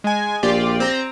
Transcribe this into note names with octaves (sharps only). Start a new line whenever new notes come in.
G#3 G#5
A#1 F4 G4 D5
C4 A#5